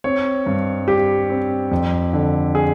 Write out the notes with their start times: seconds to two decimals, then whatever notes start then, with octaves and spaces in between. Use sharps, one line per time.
0.04 C4 C#5
0.46 G2
0.88 G3 G4
1.30 C4
1.71 F2
2.13 D3
2.55 G#4